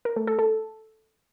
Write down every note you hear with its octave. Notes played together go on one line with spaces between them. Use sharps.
A#4
A3
A4
A4